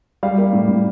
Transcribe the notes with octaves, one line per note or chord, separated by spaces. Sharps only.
G3 F5
A#3
A2
A2